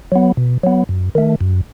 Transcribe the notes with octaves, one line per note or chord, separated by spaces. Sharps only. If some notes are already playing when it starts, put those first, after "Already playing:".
F#3 B3
B2
F#3 B3
F#2
D#3 A3
F#2